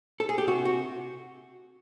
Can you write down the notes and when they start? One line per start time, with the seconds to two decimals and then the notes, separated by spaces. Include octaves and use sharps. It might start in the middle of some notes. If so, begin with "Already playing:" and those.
0.20 A4
0.29 G#4
0.38 G4
0.47 C3 F#4
0.65 F#4